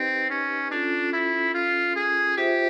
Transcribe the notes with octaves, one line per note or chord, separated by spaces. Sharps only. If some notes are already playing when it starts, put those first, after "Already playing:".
Already playing: C4 D#4 G4 B4 D#5
C#4
C#4 D4 F4 A4
E4
F4
G#4
F4 G4 G#4 C5 E5